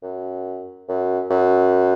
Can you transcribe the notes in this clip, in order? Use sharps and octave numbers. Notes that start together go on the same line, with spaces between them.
F#2
F#2
F#2